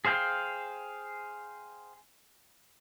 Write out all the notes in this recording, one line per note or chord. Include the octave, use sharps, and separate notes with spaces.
G#4 C5 F5 G5